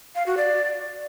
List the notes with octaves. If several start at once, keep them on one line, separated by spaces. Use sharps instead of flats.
F5
F#4
D5